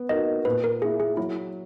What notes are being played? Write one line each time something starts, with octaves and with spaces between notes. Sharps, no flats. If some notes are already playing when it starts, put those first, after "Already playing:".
Already playing: B3
D#4 F#4 A#4 D#5
A#2 B4
A#4
A#3 E4 G#4
G#4
F#3 E4